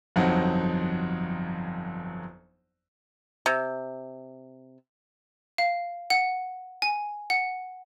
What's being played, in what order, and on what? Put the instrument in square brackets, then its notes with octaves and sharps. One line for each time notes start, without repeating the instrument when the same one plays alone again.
[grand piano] G1 F2 F#3 C4 D#4 F#5
[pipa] C3
[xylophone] F5
F#5
G#5
F#5